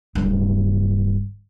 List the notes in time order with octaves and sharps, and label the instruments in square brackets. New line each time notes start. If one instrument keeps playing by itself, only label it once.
[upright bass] D1 G2